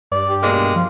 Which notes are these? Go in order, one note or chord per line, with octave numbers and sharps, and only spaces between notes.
G2 D5
G4
B2 G#3 A#3 D4
G2
F3 F4